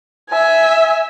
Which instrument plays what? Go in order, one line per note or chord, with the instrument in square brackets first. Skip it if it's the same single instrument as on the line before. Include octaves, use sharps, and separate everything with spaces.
[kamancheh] E5 G#5